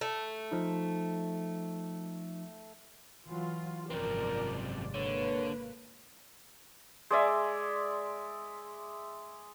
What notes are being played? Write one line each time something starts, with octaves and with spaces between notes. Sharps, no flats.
A3
F3 D#4
E3 F#3 F4
G#1 F#2 C3 F3 C4 A#4 D5
D3 A#3 B4 C#5
G#3 D5 E5